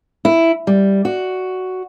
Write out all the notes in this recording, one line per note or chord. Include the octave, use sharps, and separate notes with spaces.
E4
G3
F#4